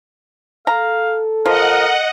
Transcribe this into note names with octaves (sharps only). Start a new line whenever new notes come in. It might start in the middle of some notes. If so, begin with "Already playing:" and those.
A4 F5 A#5
F3 A#4 D#5 F#5